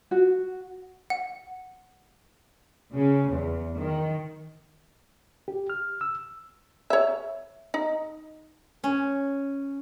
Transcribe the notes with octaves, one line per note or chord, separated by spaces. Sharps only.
F#4
F#5
C#3
E2
D#3
G4
F6
E6
C#5 E5
D#4
C#4